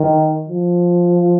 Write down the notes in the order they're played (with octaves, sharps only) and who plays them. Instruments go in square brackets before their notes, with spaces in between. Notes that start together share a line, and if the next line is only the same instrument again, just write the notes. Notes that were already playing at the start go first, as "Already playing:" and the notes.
Already playing: [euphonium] D#3
F3